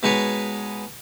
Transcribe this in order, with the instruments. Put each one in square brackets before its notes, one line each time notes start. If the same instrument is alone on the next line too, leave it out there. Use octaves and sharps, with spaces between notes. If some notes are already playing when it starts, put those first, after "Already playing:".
[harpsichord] B2 G#3 D#4 B4 C#5